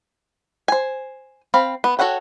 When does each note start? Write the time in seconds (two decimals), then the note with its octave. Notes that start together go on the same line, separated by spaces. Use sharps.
0.68 C5 G#5
1.54 C4 F5 B5
1.84 B3
1.99 F#4 A4 C#5 F#5 G5